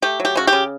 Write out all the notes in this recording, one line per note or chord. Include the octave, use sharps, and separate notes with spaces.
A3 G4
F#3
G4
C#3 F#4
G4
C#3